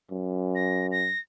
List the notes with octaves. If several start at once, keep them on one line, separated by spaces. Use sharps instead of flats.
F#2
A#6
A#6